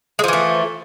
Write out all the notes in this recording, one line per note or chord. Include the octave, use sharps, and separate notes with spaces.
E3 F3 G#3 A3